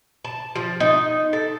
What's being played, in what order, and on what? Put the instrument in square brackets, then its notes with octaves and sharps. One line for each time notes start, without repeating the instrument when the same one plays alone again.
[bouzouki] A5
F3
D#4
A4